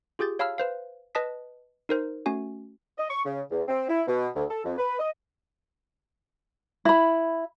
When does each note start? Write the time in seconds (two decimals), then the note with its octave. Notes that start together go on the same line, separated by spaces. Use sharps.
0.19 F4 G4 G#4 G6 A6
0.39 C#5 F5 A5 B5 E6 F6
0.58 B4 C5 F5
1.15 B4 D#5 A5 D#6 B6
1.89 D#4 A#4 C5
2.26 A3 C#4 F#4 G#5
2.98 D#5
3.09 C#6
3.24 C#3
3.51 E2
3.68 C4
3.89 E4
4.07 B2
4.34 D2
4.49 A4
4.64 F2
4.78 B4
4.99 D#5
6.85 E4 B5